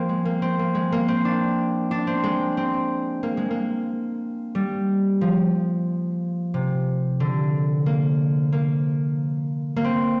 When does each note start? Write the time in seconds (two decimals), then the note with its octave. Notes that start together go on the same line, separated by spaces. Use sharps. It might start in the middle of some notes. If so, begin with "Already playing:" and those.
Already playing: F3 A#3 C4
0.09 G#3
0.25 A#3
0.42 C4
0.59 A#3
0.75 G#3
0.92 A#3
1.08 C4
1.25 D4
1.91 D4
2.07 C4
2.24 G#3
2.57 C4
3.23 A#3
3.37 G#3
3.51 A#3
4.55 G3
5.21 F3
6.54 C3
7.20 D3
7.86 A#3
8.52 A#3
9.76 A#3
9.84 C4